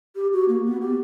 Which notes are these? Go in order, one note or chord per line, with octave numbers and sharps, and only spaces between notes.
G4
F#4
A#3
B3
G4